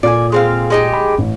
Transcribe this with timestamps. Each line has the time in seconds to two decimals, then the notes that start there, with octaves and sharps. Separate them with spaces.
0.03 A#2 A4 D5 F5 G#5
0.32 G#3 C4 F5
0.70 G#3 D#4 G4
0.93 B5
1.18 A1